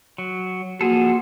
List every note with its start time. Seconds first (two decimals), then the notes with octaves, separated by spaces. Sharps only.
0.18 F#3
0.81 F3 A#3 F#4 G#4 A4